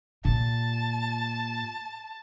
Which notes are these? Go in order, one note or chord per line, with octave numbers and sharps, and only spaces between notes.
A#2 A5